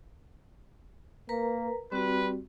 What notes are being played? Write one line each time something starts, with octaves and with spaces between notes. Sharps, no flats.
A#3 A#4 B4 A#5
G3 C4 F#4 B4